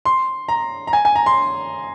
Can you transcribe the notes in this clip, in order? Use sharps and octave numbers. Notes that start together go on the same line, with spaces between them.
C6
A#5
A#5
G#5
G#5
A#5
C6